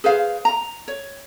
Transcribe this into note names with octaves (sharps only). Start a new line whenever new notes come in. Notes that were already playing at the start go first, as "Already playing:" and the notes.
G#4 B4 C5 F5
A#5
C#5